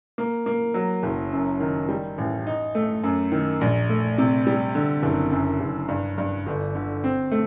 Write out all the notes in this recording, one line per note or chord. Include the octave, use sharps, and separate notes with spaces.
A#3
A#3
F#3
F#1
F#2
D#3
G3
A1
D#4
A3
F#2
D#3
A#1
A3
C3
G3
D3
F#1
F#2
F#1
G2
G2
G1
D3
C4
A3